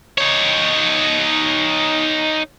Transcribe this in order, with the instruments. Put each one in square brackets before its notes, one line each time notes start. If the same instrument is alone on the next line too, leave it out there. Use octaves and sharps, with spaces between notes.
[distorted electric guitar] D#4 C#5